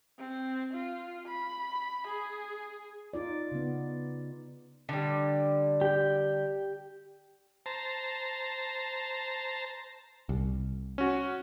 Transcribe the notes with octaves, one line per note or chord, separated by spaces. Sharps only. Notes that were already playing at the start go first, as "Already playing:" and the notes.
C4
F4
B5
G#4
D#4 F4 D5
C#3 B3
D3 G3
G4 G5
C5 A5 A#5
C2
C#4 F#4